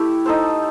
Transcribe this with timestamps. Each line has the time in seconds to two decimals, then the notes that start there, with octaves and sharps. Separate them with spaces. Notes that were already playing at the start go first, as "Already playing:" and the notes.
Already playing: A3 E4 G4
0.26 D#4 A4 C5